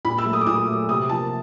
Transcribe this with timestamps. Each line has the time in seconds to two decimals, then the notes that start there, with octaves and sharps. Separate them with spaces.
0.05 A#2 B5
0.18 E6
0.25 F#3 A3
0.33 D#6
0.41 D6
0.47 A#2 D#6
0.67 F#3 A3
0.89 C3 D#6
1.09 F3 A#3 A5